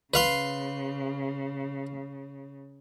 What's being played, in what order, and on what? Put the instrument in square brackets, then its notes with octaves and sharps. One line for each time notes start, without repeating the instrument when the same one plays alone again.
[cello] C#3 [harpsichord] B4 F5 C6